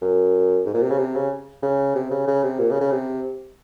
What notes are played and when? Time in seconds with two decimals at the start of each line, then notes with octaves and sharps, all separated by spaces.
0.02 F#2
0.66 G#2
0.74 A#2
0.82 C3
0.90 C#3
0.98 C3
1.15 C#3
1.62 C#3
1.95 C3
2.11 C#3
2.27 C#3
2.43 C3
2.59 A#2
2.71 C#3
2.81 C#3
2.91 C3